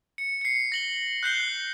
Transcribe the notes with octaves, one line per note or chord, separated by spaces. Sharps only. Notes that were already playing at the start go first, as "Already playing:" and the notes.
C#7
C7 C#7
A#6 F#7 G7
F#6 G6 C7 G7